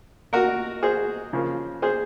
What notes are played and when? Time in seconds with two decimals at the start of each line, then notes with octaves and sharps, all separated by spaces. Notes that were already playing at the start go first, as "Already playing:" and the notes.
0.33 F#4 A#4
0.83 G#4 C5
1.33 C#3 F3 A#3
1.82 G#4 C5